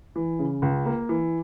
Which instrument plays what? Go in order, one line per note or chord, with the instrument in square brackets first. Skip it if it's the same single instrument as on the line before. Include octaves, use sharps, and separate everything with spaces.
[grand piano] E3
C#3
C#2
A#3
E3